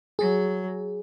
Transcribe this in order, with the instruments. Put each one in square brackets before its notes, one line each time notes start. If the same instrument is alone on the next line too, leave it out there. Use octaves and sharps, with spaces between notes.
[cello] F#3 [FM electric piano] G#4